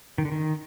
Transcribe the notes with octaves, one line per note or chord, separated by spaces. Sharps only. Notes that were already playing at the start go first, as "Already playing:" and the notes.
D#3
D3
D#3